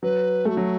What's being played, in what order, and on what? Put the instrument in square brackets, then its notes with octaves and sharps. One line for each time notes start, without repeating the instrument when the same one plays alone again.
[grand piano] F#3 [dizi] B4
[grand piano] A3 [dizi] G#4
[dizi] F#4
[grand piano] F#3